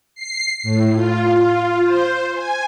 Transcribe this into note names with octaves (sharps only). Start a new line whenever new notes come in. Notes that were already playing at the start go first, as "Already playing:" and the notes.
C7
A2
F4
C5
G#5